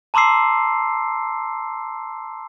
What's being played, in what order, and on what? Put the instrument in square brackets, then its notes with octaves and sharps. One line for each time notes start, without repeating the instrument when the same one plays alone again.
[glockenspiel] A5 A#5 C6 D6 E6 C7